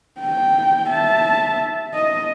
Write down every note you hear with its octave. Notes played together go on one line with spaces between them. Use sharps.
G5
E5 A5
D#5